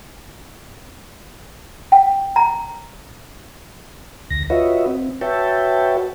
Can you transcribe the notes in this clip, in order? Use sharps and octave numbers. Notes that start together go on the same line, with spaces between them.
G5
A#5
D2 A#6
F4 F#4 B4 C#5 D#5 E5
C4
F#4 B4 C#5 E5 G5 A5